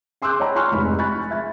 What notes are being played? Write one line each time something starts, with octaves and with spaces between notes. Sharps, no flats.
G#5 C6 D6 E6 F#6 G6
C#5 D#5 G5 A#5 B5
G#5 A#5 C6 C#6 F6 F#6
F1 G#2 B5
G#5 B5 C#6 F#6 A6
E5 A6